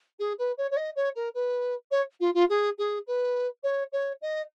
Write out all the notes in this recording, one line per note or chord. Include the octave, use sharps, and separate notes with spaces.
G#4
B4
C#5
C#5
D#5
C#5
A#4
B4
C#5
F4
F4
G#4
G#4
B4
C#5
C#5
D#5